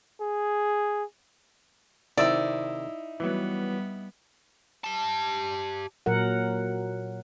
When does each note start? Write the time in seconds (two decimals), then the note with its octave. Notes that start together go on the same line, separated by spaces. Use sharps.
0.21 G#4
2.17 C3 D#3 C4 D#4 E4 D5 E6
3.20 E3 F#3 G3 B3
4.84 G4 A5
6.06 A#2 F#3 A#4 F#5